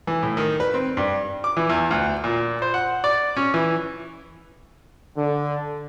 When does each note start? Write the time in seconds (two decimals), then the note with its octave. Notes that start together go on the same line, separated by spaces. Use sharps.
0.07 E3
0.23 A2
0.37 D#3
0.60 B4
0.74 C4
0.97 G2
1.44 D6
1.57 E3
1.69 E2
1.91 D2
2.24 A#2
2.62 C5
2.74 F#5
3.04 D5
3.37 C#4
3.54 E3
5.16 D3